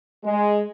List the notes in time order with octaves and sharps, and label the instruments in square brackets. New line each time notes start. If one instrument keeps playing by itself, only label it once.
[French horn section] G#3